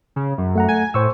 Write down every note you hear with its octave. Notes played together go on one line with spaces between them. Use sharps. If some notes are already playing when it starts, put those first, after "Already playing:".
C#3
F#2
A3 F#5 A#5
G#5
A2 C5 C#6 E6